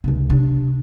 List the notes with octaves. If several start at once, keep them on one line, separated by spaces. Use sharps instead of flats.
C#2 C3
C3 D4